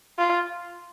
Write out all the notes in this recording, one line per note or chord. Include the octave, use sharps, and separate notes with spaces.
F4